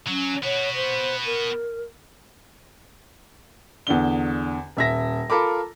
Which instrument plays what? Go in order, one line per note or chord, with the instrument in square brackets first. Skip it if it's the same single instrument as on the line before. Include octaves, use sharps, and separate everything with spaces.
[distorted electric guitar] F#3 [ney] C#4
[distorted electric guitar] B3 F#4 [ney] C#5
[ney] C5
A#4
[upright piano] E2 D3 G7
D#1 E5 A#6
F4 A4 A#4 B5 D6